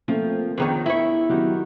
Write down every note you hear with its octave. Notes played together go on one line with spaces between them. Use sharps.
F3 A3 A#3 C4
A#4
F2 D#3 B3 D4 G#4 C#5
E4 C#5
D#3 F#3 B3 F#4 G4